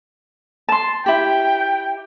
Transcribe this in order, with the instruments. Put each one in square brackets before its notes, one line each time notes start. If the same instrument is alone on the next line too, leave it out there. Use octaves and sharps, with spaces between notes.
[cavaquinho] A5 C6
[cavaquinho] E4 G4 [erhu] G5